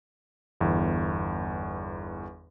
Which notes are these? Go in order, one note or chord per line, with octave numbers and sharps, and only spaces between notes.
G1 E2